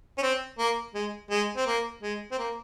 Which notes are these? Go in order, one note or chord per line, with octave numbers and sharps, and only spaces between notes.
C#4
C4
A#3
G#3
G#3
C4
A#3
G#3
C4
A#3